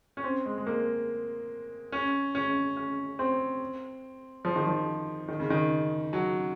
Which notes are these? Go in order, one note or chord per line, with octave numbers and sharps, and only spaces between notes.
C#4
C4
G#3
G#3
A#3
C#4
C#4
C#4
C4
F3
D#3
F3
D#3
C#3
D#3
F#3